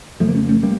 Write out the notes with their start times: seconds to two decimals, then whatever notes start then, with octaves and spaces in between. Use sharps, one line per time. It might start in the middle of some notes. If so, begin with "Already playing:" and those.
0.20 F2 C#3 F3 A3
0.29 A#3
0.35 A3 C#4
0.49 A3 C#4
0.63 G3 A#3